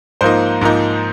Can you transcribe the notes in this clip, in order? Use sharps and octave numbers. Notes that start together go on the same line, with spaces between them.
G#2 F3 A#3 D#4 C5
G#2 F3 A#3 D#4